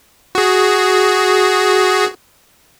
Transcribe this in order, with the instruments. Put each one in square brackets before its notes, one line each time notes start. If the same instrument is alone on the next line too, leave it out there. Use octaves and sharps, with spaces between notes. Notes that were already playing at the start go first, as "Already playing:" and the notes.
[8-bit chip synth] F#4 G#4